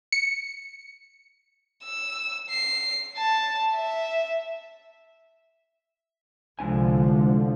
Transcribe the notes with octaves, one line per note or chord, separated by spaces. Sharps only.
C#7
E6
C7
A5
E5
C2 D3 F3 G#3 D4 G#5